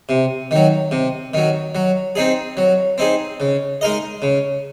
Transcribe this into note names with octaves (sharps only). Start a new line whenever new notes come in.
C3
D#3 F#3
C3
D#3 F#3
F#3
C4 D#4 G#4
F#3
C4 D#4 G#4
C#3
G#3 D#4 A#4 D#5
C#3